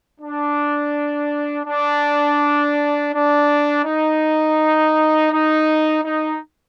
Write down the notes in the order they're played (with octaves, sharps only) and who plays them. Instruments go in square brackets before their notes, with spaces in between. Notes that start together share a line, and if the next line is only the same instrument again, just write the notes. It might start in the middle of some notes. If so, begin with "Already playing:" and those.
[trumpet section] D4
D4
D4
D#4
D#4
D#4